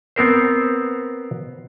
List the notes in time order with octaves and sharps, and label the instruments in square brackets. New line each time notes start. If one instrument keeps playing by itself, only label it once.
[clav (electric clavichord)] B3 C4 A#4 C5